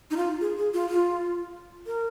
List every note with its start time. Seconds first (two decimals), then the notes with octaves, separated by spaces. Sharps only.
0.11 D#4
0.16 F4
0.41 G#4
0.58 G#4
0.74 F4
0.90 F4
1.87 A#4